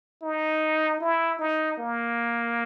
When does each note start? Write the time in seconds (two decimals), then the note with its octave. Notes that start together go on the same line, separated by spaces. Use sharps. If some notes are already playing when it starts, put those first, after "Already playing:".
0.23 D#4
1.01 E4
1.39 D#4
1.78 A#3